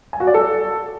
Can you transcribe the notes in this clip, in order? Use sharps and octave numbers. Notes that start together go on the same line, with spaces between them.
G#5
F#4
D5
A4